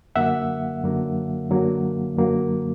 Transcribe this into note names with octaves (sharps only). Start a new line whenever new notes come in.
F#2 D3 F#3 A#3 E5 F#5
F#2 D3 F#3 A#3
F#2 D3 F#3 A#3
F#2 D3 F#3 A#3